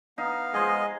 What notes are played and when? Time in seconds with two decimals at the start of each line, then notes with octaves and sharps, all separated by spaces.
0.18 B3 D#4 F5
0.54 G#3 G#4 C5 D#5